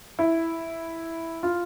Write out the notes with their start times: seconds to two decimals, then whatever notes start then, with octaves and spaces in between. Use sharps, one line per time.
0.19 E4
1.43 F4